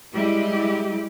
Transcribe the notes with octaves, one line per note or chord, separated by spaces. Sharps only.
G3 G#3 E4 G4